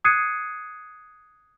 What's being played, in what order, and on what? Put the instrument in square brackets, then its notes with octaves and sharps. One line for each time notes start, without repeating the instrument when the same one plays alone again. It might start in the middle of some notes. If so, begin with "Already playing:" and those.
[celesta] D#6 F#6 G#6 C7 C#7 D#7